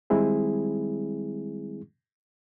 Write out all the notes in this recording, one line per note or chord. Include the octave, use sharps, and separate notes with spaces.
D#3 G3 G#3 C4 E4 G#4